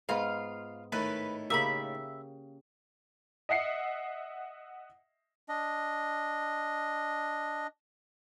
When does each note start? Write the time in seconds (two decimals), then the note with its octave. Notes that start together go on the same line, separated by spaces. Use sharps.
0.09 G#2 B3 F4 F5
0.92 A2 D#3 B4
1.50 C#3 A#3 G4 E5 B5
3.49 D#5 E5 F#5 C7 C#7
5.49 D4 D#5